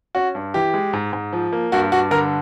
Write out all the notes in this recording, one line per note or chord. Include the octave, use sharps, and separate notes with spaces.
C#4 F#4
G2
E3 G4
G#3
G#2
G#2
F3
A#3
G2 F#4
G2 F#4
D3 A#4